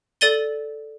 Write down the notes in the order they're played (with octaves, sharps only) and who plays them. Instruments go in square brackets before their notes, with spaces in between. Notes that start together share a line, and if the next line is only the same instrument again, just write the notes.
[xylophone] A4 D5 A6 D#7 G7